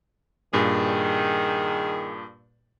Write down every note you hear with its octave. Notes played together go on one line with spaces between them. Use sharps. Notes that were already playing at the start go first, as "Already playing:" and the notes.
G2 A#2 D#3 G#4